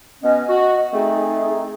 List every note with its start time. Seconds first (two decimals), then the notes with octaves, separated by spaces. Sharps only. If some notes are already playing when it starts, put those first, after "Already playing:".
0.22 B2 B3 C#4 D#5
0.49 F#4
0.93 A3 C4 D#4 G#4